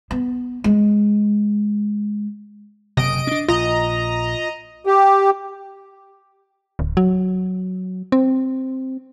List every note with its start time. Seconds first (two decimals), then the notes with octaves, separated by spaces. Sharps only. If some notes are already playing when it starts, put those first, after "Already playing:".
0.11 B3
0.64 G#3
2.97 F#1 C3 D#5 D7
3.27 C#4 D4
3.48 A#1 F4 D#5 A#5
4.86 G4
6.79 D1
6.97 F#3
8.12 C4